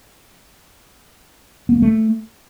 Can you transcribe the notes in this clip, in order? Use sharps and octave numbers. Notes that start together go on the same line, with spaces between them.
B3
A#3
A3